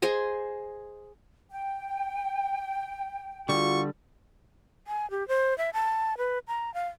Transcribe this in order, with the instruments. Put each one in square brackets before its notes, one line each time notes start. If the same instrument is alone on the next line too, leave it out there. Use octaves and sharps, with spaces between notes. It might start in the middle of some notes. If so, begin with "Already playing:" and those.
[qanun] G#4 C5 D#5 G#5
[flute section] G5
[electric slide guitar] D3 G3 [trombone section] F4 F#4 [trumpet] C#6
[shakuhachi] G#5
G4
C5
E5
A5
B4
A#5
F5